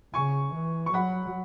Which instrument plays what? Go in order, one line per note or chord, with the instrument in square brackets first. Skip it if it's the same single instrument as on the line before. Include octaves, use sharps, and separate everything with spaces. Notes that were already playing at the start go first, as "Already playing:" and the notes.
[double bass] C#3 [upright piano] G#5 C#6
[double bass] E3
[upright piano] C#6
[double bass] F#3 [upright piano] F#5 B5